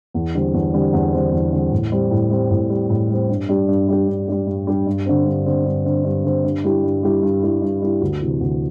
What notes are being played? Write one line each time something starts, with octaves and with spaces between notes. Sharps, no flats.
E2
D3 G3 C4
E2
D3 G3 C4
E2
D3 G3 C4
E2
D3 G3 C4
A2
G3 C4
A2
G3 C4
A2
G3 C4
A2
G3 C4
G2
G3 D4 G4
G2
G3 D4 G4
G2
G3 D4 G4
G2
G3 D4 G4
G2
D3 C4
G2
D3 C4
G2
D3 C4
G2
D3 C4
G2
G3 E4 G4
G2
G3 E4 G4
G2
G3 E4 G4
G2
G3 E4 G4
D2
C3 E3
D2